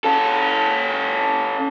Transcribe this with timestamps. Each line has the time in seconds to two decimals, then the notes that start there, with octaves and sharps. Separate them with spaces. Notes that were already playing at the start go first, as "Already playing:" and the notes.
0.05 C#4 A4